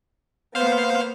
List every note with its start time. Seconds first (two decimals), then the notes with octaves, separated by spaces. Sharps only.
0.55 A#3 B3 C5 F5